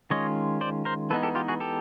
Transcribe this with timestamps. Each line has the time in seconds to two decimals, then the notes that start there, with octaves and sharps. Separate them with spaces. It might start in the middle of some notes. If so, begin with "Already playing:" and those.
0.10 D#3 G#3 C#4 F4 C#5 D#5
0.61 C5 D5
0.85 A#4 C5
1.10 E3 G#3 B3 D#4 A4 B4
1.23 G4 A4
1.35 F4 G4
1.48 F#4 G#4
1.60 G4 A4